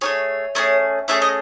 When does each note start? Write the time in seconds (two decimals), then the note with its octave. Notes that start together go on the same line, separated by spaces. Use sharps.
0.01 A3 C#4 G#4 C#5
0.55 A3 C#4 G#4
1.08 A3 C#4 G#4 E5
1.22 D#5